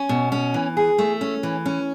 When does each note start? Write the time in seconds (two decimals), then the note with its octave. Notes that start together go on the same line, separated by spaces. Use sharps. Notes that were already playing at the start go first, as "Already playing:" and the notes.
Already playing: C#4
0.09 B2
0.32 C#4
0.54 E3
0.77 G#4
0.98 A3
1.21 C#4
1.43 E3
1.66 C#4